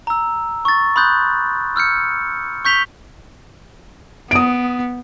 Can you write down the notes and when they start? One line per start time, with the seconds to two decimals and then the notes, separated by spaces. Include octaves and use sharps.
0.07 A#5 E6
0.65 C#6 A6
0.96 B5 C6 D#6 F#6 G6 A6
1.76 E6 F6 G6 C#7
2.65 C#6 G6 B6 F7 G7
4.31 B3 D#6 D7